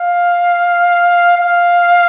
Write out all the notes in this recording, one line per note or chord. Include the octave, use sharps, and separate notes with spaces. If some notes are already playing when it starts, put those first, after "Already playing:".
Already playing: F5
F5